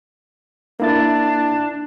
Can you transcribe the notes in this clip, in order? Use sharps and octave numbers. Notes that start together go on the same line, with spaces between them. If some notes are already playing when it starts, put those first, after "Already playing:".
A#3 D4 E4 A6